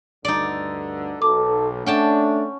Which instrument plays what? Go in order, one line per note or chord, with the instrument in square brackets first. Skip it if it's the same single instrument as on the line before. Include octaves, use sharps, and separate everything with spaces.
[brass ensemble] D2 G2 D3 [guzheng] D#4 D5
[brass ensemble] B1 [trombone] A4 [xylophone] D6
[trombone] A3 [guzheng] C#4 G5 A5 [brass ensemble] D4 [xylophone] F#5